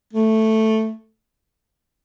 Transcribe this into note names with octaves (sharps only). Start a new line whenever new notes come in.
A3